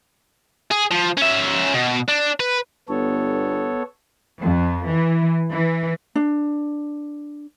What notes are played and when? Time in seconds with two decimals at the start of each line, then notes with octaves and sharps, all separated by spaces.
0.71 G#4
0.91 F3
1.17 C#4 E5
1.74 B2
2.08 D4
2.40 B4
2.89 G1 B3 A4 C#5
4.43 F2
4.88 E3
5.50 E3
6.15 D4